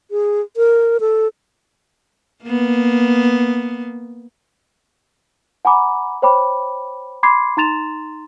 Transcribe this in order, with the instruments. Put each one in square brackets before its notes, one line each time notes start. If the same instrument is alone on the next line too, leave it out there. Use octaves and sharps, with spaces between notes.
[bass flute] G#4
A#4
A4
[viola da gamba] A#3 B3
[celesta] F#5 G#5 A#5 B5 D6
C5 C#5 G5 B5 D6
B5 C6 D6 G#6 C7
D#4 A#5 C6 A6 E7 F7